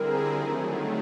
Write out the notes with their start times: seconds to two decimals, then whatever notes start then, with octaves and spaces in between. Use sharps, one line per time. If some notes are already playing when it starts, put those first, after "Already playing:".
Already playing: D3 G3 C4 E4 G#4 A#4
0.28 D#3 F#3 A3